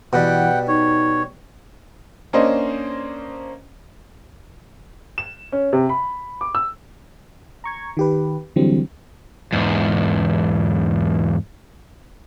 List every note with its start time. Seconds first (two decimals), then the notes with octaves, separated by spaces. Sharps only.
0.13 B2 E3 G3 F#5 G5
0.68 D#4 C#5
2.33 A#3 C#4 D4 C5 D#5
5.18 E7
5.52 C#4
5.73 C3
5.89 B5
6.41 D6
6.55 E6
7.64 A#5 C#6 G#6
7.97 D#3 G4 B4
8.56 D3 E3 F#3 G3 C4
9.52 E2 G#2